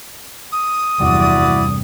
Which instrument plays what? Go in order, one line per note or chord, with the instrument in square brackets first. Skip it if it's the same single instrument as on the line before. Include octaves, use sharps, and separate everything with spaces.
[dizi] D#6
[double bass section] F1 E2 G2 [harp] C3 G3 [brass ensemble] E4 F#4 D5